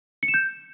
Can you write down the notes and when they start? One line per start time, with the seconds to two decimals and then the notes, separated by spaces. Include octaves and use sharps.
0.23 C#7
0.28 E7
0.34 G6